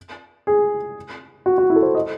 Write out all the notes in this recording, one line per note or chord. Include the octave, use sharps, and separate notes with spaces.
G#4
F#4
F#4
E4
A4
C5
D#5